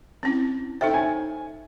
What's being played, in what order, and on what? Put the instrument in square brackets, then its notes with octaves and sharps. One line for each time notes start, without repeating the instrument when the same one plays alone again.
[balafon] C4 C#4 E4
[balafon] D#4 A4 C5 [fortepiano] E5 G5
[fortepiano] G#5